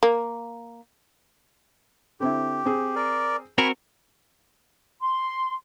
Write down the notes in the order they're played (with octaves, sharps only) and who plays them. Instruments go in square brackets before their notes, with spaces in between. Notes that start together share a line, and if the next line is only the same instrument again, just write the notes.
[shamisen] A#3
[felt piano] D3 C4 E4 [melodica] G4
[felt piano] C4 G#4
[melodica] A#4 D5
[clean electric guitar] C4 F#4 A#4 [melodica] G#5 B5 C#6
[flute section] C6